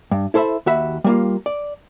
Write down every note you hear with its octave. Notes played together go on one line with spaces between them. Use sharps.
G2
E4 A4 C5 E5 B5
D#2 F#4 E5 B5
G3 A#3 F4
D5